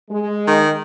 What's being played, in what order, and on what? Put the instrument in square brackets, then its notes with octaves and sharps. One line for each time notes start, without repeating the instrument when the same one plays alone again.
[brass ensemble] G#3
[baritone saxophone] D#3